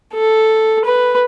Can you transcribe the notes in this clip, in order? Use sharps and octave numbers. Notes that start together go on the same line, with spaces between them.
A4
B4